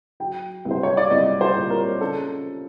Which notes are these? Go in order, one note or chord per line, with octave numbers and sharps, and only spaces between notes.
F#3 G5
C2
C5
C#5
D5
C2 D#5
C5
A#2
A#4
C#3 A4